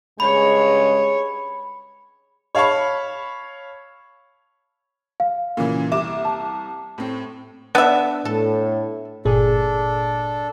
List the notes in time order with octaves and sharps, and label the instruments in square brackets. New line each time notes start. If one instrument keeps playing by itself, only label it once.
[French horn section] G2 C#3 G#3 [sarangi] C#5 [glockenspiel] B5
[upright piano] C#5 F5 A5 B5 C#6
[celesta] F5
[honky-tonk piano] A#2 C#3 E3
[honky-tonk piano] C2 D6 E7 [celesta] E5
[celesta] A5
[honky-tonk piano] A2 C4
[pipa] B3 E5 [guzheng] D4
[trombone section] A2 [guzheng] A4
[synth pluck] G1 A#2 G#4 [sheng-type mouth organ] D4 A4